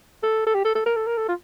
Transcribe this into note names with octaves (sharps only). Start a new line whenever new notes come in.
A4
A4
G4
A4
A4
A#4
A4
A#4
A4
F4